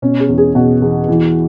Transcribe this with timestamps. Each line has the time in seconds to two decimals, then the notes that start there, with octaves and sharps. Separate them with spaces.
0.02 B2 C#4
0.20 G#4
0.29 E2
0.38 G#4
0.55 B2 F#4
0.82 E2
1.08 E3